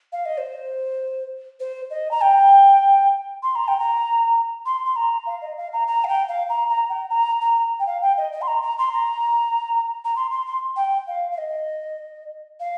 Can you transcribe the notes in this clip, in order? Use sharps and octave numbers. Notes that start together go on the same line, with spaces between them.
F5
D#5
C5
C5
D#5
A#5
G5
C6
A#5
G5
A#5
C6
C6
A#5
F5
D#5
F5
A#5
A#5
F5
G5
F5
A#5
A#5
G5
A#5
A#5
G5
F5
G5
D#5
D#5
C6
A#5
A#5
C6
A#5
A#5
C6
C6
C6
G5
F5
F5
D#5
F5